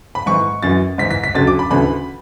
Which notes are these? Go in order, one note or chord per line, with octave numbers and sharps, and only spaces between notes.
B5
G#2 E3 C#6
F#2 E3 A6
G#2 E3 B6
B6
B6
D2 C#3 F#3 A6
D6
B5
D2 C#3 E3 B5